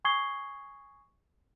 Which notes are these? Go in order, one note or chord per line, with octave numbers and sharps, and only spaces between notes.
G#5 C#6 D#6 G#6 C7 G7